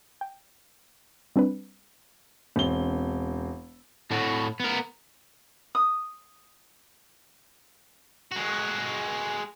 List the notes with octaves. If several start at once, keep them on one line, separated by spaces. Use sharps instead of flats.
G5
G3 C4 D4 B4
E1 C4 G7
A2 F#4
B3 A#4
D#6
G#3 F#4